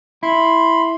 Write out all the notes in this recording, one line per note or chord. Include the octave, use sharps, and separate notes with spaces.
E4 B5 C6